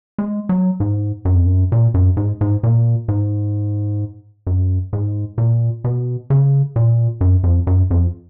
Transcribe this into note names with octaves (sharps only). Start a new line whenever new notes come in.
G#3
F#3
G#2
F#2
F2
F#2
A#2
F#2
G#2
G#2
A#2
G#2
F#2
G#2
A#2
B2
C#3
A#2
F#2
F2
F#2
F2